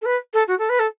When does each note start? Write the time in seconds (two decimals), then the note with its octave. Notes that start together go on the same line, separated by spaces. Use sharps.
0.02 A4
0.06 B4
0.34 A4
0.48 F#4
0.59 A4
0.69 B4
0.79 A4